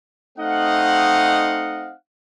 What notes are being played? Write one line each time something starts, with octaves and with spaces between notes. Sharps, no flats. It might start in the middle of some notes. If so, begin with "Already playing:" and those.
A3 C4 D#4 D#5 F5 F#5